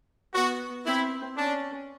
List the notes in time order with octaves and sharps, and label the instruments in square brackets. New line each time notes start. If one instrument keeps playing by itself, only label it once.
[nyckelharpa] B3 [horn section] F#4
[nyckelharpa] C4 [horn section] E4
[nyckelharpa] C#4 [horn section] D4